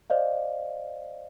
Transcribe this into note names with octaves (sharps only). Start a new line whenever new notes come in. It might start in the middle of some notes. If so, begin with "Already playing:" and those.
C5 D5 D#5 F5